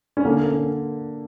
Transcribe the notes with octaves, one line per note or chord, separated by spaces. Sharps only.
C#4
D3 A#3
A#3
C#4
A#3